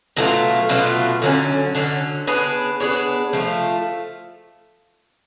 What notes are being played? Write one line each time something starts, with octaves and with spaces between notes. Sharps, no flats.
B2 F#3 A3 F4
B2 F#3 A3 F4
D3 F#3 A3 C#4
D3 F#3 A3 C#4
B3 D4 G#4 C#5
B3 D4 G#4 C#5
F3 A3 F4